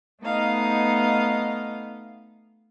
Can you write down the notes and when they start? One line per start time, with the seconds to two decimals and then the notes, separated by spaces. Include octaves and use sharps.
0.23 A3 B3 D#4 D#5 F5